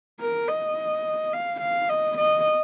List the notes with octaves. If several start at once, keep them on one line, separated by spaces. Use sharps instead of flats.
A#4
D#5
F5
F5
D#5
D#5